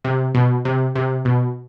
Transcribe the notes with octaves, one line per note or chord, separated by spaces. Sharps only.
C3
B2
C3
C3
B2